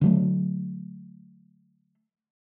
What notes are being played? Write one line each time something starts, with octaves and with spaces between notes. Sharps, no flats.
D3 F#3 A3